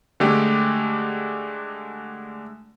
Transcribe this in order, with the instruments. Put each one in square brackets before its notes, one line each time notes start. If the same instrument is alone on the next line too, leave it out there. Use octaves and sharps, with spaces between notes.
[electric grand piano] D3 G#3 A3 G4